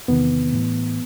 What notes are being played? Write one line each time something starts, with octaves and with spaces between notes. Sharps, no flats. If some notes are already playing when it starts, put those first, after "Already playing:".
E2 C3 D#3 B3
A2 E3